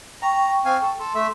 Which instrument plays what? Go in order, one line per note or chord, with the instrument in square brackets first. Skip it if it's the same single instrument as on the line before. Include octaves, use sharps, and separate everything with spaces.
[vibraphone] G5 C#6 [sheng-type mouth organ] A#5
[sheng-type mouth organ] C4 F5 G#5
A4
[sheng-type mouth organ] A4 [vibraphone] C6
[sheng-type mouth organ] A3 E5